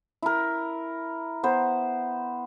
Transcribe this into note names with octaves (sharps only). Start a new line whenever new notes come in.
E4 A#4
B3 C5